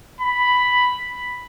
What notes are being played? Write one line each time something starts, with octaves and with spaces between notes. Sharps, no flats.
B5